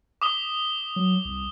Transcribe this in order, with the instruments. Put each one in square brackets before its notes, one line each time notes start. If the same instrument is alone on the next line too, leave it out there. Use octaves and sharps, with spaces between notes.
[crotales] D6 D#6 G7
[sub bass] F#3
C2